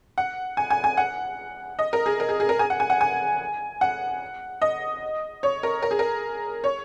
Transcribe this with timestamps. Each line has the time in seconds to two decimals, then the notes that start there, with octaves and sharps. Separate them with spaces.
0.18 F#5
0.57 G#5
0.70 G#5
0.84 G#5
0.97 F#5
1.79 D#5
1.93 A#4
2.06 G#4
2.20 A#4
2.29 G#4
2.40 G#4
2.49 A#4
2.59 G#5
2.70 F#5
2.80 G#5
2.90 F#5
3.01 G#5
3.81 F#5
4.62 D#5
5.43 C#5
5.63 A#4
5.83 A#4
5.91 G#4
5.99 A#4
6.64 C#5